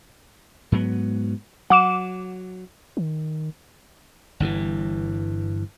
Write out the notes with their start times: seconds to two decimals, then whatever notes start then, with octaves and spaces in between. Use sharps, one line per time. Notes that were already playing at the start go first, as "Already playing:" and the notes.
0.72 G#2 F#3 B3
1.70 F#3 F#5 D6 E7
2.97 D#3
4.40 G1 G2 C3 E3